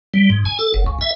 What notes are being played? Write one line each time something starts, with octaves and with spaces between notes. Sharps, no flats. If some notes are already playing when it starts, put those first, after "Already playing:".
G3
G#2
G#5
A4
F#1
C#2
E5